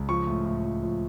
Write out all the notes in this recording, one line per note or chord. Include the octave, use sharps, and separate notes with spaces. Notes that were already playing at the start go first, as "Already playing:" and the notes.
Already playing: C#2
F3 C#6
A2
A2
F3
F3